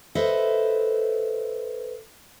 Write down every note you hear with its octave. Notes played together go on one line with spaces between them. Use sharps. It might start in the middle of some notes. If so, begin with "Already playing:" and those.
A4 B4 C5 D#5 E5